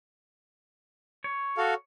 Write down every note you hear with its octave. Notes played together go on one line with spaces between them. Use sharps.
C#5
F#4 A4 F5